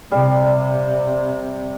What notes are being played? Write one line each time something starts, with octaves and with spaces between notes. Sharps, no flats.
C3 G3 F5